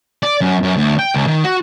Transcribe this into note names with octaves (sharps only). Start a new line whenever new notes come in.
D5
F#2
F#2
D2
G5
C#2
D#3
F#4